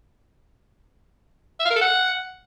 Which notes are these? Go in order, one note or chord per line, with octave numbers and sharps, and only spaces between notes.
E5
F5
A#4
A4
F#5